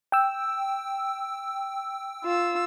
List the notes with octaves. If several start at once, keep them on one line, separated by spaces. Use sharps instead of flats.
G5 E6
F4 E6